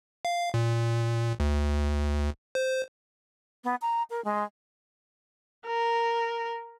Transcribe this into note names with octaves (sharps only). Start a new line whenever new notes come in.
F5
A#2
D2
C5
B3
A#5
A#4
G#3
A#4